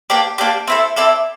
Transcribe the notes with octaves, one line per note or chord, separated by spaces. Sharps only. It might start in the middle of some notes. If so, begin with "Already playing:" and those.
A#3 D4 G4 D5
A#3 D4 G4 D5
C4 E4 A4
C4 E4 A4 D5